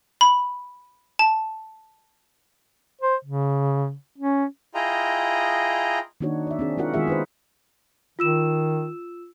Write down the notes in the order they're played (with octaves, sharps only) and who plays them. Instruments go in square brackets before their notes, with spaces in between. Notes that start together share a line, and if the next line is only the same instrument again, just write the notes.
[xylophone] B5
A5
[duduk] C5
C#3
C#4
[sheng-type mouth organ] E4 F4 G#4 D#5 G5 A#5
[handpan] D#3 A#3 D4 D#4 F#4 C#5
D5 E5
C4 D4 G#4
G#3 D#4 F4 F#4 A#4 F#5
D#3 G#3 B3 F4 G#4 E5
D#4 B4 C5
[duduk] D#3 [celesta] F4 E6 E7